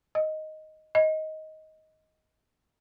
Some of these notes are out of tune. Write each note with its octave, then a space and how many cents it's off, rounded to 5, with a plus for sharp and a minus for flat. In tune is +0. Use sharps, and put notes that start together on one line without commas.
D#5 +5
D#5 +15